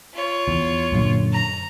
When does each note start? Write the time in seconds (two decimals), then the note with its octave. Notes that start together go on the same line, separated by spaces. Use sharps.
0.14 F4 C#5
0.48 E2
0.92 F#2 A#2 D3
1.32 A#5